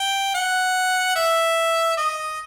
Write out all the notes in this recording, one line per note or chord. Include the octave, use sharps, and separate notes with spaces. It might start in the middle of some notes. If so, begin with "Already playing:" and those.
Already playing: G5
F#5
E5
D#5